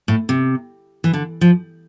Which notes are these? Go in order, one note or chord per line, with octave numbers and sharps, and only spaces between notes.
A2
C3
E3
D3
F3